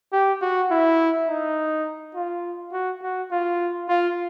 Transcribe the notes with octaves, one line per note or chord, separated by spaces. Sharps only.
G4
F#4
E4
D#4
F4
F#4
F#4
F4
F4